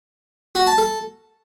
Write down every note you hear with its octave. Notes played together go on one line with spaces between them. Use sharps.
F#4
A5
A4